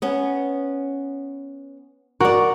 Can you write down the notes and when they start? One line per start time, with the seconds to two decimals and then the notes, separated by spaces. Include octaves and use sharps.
0.02 B3 C#4
2.20 F#4 A#4 D5